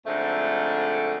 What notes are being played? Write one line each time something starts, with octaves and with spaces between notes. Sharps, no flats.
F2 G#2 D3 A3